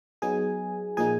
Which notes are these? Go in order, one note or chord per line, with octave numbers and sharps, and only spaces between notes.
F#3 B3 D#4 G#4 G#5
A#2 F3 A#3 D#4 G#4 G#5